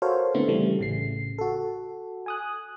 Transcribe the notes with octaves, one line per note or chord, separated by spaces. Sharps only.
F#4 A4 A#4 C5 C#5 F5
D3 A3 B3 C4 E4
C#3 E3 G3 A3
A1 C#3 C7
F#4 A4
G#5 D#6 F#6